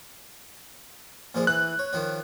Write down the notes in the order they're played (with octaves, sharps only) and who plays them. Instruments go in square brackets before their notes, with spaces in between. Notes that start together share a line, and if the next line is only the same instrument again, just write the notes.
[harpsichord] A#2 F3 G#3
[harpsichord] E3 [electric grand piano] F#6
[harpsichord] C#5
D#3 F3 C#5